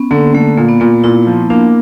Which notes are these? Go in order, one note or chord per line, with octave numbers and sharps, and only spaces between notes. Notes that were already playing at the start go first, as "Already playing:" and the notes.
Already playing: B3 C#4
D3 A#3
D3 A3
A#2 A#3
B3
A#2 A#3
A#2 E4
F3
A#3 D4